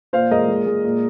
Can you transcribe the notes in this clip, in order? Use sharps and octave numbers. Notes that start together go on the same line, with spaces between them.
A#2 C5 F5
G#3 A#4 D#5
G#3
G#3
A#2